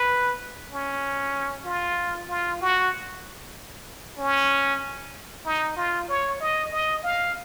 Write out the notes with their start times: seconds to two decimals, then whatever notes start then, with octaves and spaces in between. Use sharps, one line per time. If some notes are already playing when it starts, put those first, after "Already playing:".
Already playing: B4
0.71 C#4
1.65 F4
2.28 F4
2.61 F#4
4.18 C#4
5.45 D#4
5.76 F4
6.09 C#5
6.40 D#5
6.72 D#5
7.03 F5